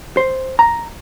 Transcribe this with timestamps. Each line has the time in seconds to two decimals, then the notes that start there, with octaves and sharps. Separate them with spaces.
0.17 C5
0.59 A#5